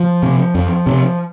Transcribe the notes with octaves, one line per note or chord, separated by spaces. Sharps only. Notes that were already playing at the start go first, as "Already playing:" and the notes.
Already playing: F3
C3
F2
C3